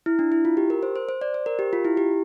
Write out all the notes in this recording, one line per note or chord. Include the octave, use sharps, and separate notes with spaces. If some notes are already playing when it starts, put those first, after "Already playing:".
E4
D4
E4
F4
G4
A#4
C5
C5
C5
D5
C5
A#4
G4
F4
E4
G4